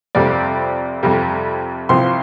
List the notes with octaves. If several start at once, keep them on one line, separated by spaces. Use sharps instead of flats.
F2 C3 G3 C4 D5
F2 C3 G3
C2 C3 F3 C6